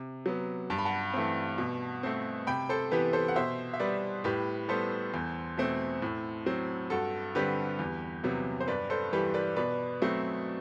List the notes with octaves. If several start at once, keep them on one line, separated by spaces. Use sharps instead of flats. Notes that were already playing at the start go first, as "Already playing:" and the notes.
Already playing: C3
F#3 B3
G2 A5
B5
F#5 A5
E3 A3 C4
B2
A3 C4
C3 G5 B5
A4 C5
E3 B3 G4 B4
A4 C5
F#5
B2 C5 E5
E5
G3 B3 B4 D5
A2 G4 B4
G3 B3 A4 C5
E2
B2 A3 C4
A2
F#3 C4
G2 F#4 A4
D3 G3 C4 G4 B4
E2
C3 F#3 B3
C5
G2 B4 D5
A4 C5
E3 G3 G4 B4
B4 D5
B2 B4 D5
F#3 A3 C4